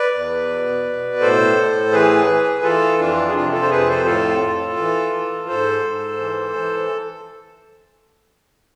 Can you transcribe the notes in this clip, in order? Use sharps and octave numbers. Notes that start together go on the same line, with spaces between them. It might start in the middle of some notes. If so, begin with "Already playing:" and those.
Already playing: B4 D5
E2
B2
B2
A2 A4 C5
A2
E3 G#4 B4
E3
E3 F4 A4
F2 D4 F4
G#4
C3 D4 F4
F4 A4
C5
F2 G#4 B4
A4 C5
A2 F4 A4
A2
E3
E3
G#2 A4 C5
G#2
E3
E3